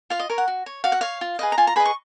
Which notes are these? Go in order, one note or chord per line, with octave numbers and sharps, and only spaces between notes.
F4 F5
D#5
A#4 C#5
F#5
F#4
C#5
F#4 F5
F#5
C#5 F5
F4
G#4 B4 D#5
A#5
F4 G#5
A#5
G#4 B4 D#5 B5
C#6